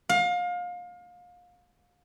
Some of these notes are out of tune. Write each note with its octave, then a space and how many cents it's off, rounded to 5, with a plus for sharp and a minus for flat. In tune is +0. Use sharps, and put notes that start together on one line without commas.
F5 +30